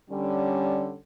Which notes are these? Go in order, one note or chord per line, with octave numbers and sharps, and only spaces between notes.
D3 G3 C#4